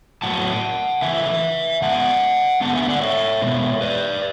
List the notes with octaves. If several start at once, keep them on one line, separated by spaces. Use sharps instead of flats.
A2 F#3 A3 F#5 A5
C#3 E3 A3 E5 G#5
C#3 G#3 B3 F#5 A5
D3 G#3 B3 F#5 A5
E5 G#5
D5 F#5
C#5 E5
B2 G#3 B3
B4 D5